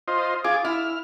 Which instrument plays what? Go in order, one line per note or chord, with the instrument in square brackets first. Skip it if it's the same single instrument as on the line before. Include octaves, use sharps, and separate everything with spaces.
[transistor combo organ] F4 C5 D#5
[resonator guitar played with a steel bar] F4 [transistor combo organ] G#4 D6
[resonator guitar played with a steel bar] E4 [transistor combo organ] F6